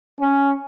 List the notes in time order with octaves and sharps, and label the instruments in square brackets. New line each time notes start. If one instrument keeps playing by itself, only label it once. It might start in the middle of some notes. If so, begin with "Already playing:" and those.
[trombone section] C#4